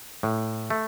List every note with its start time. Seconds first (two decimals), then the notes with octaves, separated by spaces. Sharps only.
0.23 A2
0.70 A3